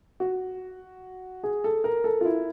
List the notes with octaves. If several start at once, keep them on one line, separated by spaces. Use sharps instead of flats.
F#4
G#4
A4
A#4
A4
F4
E4